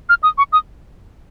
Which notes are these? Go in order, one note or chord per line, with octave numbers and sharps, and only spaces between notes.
F6
D#6
C#6
D#6